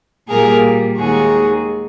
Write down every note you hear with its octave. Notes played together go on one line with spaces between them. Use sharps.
A#2 G3 A#3 G#4 A#4
D#2 D#3 G#3 F#4 G#4